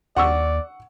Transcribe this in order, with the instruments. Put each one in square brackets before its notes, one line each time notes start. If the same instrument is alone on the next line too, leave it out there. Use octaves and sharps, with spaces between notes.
[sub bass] D#2 [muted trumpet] D5 [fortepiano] F#5 C#6 E6